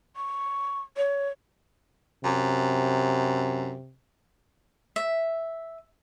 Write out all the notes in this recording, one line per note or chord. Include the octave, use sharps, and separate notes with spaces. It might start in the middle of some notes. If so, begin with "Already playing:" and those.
C#6
C#5
F#2 C3
E5